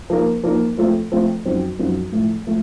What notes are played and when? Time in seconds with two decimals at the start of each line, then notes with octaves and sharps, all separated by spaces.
0.10 F3 A#3 D#4 A#4
0.44 F3 A#3 D#4 A#4
0.78 F3 A3 C4 F4 A4
1.12 F3 A3 C4 F4 A4
1.45 F#2 F3 C4 D#4 F#4
1.79 F#2 F3 C4 D#4 F#4
2.12 A2 F3 A3
2.47 F3 A3